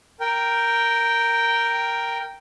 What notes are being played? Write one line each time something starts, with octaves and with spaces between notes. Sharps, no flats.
A#4 G5